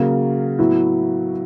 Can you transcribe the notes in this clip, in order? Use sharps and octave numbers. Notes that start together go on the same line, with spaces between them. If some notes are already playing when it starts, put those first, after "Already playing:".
Already playing: C#3 F#3 A#3
A2 F#3 B3 E4